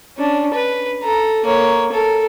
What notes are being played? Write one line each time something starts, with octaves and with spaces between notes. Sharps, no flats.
C#4 D4
B4
A4 A#5
A#3 C#5
A4 A#4